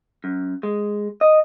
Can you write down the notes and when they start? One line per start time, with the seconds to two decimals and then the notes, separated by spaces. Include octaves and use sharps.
0.24 F#2
0.63 G#3
1.21 D#5